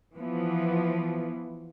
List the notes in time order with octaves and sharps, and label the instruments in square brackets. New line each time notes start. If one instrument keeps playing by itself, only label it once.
[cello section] E3 F3 B3